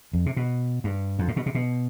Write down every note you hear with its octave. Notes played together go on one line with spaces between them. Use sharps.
F2
C3
B2
G2
F2
A2
B2
C3
B2